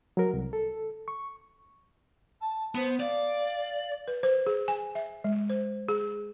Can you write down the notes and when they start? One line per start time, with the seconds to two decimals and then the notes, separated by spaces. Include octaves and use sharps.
0.17 F#3 A#4
0.33 C2
0.53 A4
1.08 C#6
2.40 A5
2.75 B3 C5
3.00 D5 F5
4.08 B4
4.23 C5
4.47 G#4
4.68 G#5
4.95 E5
5.24 G#3
5.50 C5
5.89 G#4